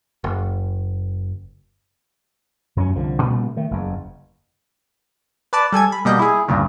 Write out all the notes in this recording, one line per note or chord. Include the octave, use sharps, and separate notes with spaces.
F#1
F#2 F#3 B3 C#4
C2 D3 F3
A#2 C#3 G3 A3
D#3 A3
F#1 E2
B4 D5 A5 D6
G3 A4 G#5 G#6
B5
B2 G3 A#3 D#5 G6
E4 G#4
D2 G2 A#2 C#3